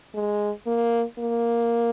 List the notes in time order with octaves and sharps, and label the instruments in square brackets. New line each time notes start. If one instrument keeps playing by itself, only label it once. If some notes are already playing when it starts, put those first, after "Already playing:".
[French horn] G#3
A#3
A#3